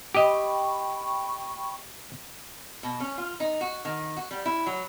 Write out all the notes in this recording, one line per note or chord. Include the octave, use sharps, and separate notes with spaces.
G4 D#5 G5 B5 C#6
B2
C#4
F4
D#4
F#4
D#3
F#4
G3
E4
F#3